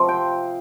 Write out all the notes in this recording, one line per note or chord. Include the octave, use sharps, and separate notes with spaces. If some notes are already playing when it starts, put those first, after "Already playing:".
Already playing: C3 F3
G5